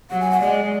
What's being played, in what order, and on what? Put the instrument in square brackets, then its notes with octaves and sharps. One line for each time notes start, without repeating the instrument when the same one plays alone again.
[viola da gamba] F#3 [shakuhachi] F#5
[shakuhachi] G#5
F#5
[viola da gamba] G#3 [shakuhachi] D5